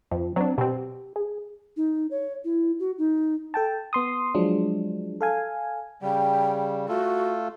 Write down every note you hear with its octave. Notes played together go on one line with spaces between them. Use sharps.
F2 F3
F#3 C4 D4
B2 C4 G4
G#4
D#4
C#5
E4
F#4
D#4
A4 G5 A5
B3 C6 D#6
F3 F#3 G#3 D4
A4 F5 G#5
C#3 G3 G5
A3 F4 F#4 A4